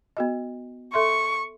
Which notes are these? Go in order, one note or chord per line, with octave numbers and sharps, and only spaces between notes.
B3 F#4 D#5
A4 E5 C6 C#6